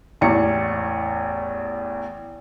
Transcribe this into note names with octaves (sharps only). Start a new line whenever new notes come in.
A1 E2 C#7